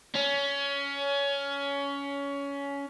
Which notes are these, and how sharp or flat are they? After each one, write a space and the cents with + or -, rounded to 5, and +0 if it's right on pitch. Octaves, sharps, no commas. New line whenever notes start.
C#4 +20